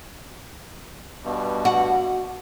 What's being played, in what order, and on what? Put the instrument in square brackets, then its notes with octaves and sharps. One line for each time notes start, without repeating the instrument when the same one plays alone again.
[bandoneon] G2 B2
[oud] F#4